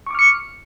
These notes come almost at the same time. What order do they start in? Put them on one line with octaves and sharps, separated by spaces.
C#6 D6 F6 C#7